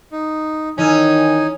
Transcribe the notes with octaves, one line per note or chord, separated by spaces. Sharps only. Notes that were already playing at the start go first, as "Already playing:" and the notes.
D#4
D#3 E3 C#4 D#4 G#5 E6